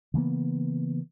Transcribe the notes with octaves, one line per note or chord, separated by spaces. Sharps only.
C#3 E3 A#3 B3